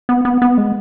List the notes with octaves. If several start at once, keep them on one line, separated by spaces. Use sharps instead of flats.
B3
B3
B3
G#3